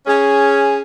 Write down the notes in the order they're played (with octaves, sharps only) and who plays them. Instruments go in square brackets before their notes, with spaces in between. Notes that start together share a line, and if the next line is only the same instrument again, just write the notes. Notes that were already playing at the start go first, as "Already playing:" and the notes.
[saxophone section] C#4 G#4